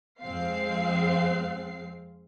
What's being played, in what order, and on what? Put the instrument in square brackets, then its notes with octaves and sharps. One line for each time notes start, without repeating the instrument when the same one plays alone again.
[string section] F2 G#3 C4 F5 C7